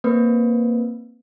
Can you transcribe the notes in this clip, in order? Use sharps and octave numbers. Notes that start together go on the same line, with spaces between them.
A#3 C4 B4